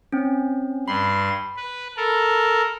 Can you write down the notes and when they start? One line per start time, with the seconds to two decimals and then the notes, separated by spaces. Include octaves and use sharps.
0.13 C4 C#4
0.88 G2 B5 C6
1.56 B4
1.97 A4 A#4